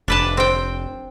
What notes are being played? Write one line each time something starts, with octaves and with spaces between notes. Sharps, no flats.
F1 D4 B4 A5
C4 G5